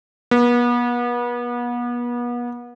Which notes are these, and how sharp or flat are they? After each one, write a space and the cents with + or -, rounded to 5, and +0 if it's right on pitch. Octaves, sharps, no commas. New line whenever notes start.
B3 -35